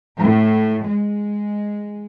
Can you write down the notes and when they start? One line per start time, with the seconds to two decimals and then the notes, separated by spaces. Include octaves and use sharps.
0.18 A2
0.86 G#3